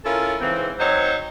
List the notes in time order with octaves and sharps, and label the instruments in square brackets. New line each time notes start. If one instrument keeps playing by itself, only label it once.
[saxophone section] C#4 E4 F4 A4 A#4
G#2 C#3 E3 C4
F#3 C4 D#4 C5 C#5